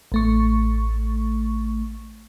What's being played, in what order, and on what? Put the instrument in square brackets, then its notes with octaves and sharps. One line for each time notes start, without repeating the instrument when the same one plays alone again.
[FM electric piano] A1 A3 C#6